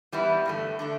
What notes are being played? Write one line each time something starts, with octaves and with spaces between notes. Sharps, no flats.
E3 G3 B3 E4
G2 D3 A3
D3 A3 D4